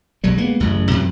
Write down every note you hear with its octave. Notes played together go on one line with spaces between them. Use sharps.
B1 F#3 G3
G#3 A#3 B3
A1 F#2 C#3
F#2 C3 F3 F#3